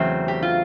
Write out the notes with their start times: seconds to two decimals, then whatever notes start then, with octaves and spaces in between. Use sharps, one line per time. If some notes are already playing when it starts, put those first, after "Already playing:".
Already playing: E2 C#3 F#3 A3 C4
0.28 G4
0.43 F4